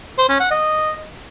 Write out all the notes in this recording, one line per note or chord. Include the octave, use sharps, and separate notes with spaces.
C5
C#4
F#5
D#5